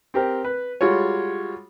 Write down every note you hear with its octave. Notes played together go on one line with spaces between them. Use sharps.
C4 G4 A#4
B4
G3 G#3 F4 F#4 C#5